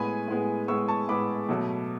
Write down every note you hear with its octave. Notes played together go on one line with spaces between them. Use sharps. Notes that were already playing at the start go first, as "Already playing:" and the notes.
Already playing: A2 G#3 B3 G#5 B5
A2 G#3 B3
A2 G#3 B3 C#6 E6
A5 C#6
A2 G#3 B3 B5 D6
B2 F#3 A3